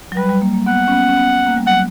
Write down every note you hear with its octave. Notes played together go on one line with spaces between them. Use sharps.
F#3
G3 B4
G3
A#3
A#3
B3 F#5
C#4
B3
C#4
B3
A#3
G3
F#3 F#5